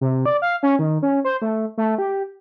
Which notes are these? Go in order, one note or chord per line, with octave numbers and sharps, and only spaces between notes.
C3
D5
F5
C#4
D#3
C#4
C5
A3
A3
G4